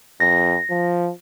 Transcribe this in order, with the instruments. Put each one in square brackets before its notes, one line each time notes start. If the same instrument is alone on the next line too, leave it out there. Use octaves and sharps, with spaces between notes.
[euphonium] F2 [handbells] A#6
[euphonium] F3